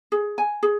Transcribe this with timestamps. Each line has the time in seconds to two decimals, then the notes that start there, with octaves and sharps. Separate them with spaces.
0.12 G#4
0.38 G#5
0.63 G#4